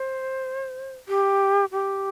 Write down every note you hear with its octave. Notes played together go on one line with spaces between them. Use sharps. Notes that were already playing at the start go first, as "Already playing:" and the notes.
Already playing: C5
G4
G4